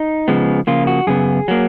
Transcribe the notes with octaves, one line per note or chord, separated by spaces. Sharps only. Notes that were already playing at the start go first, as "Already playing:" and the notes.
Already playing: D#4
C#3 F3 G#3 B3
C#3 F3 A#3 F4
F#4
F#2 C#3 B3 G#4
F#3 A#3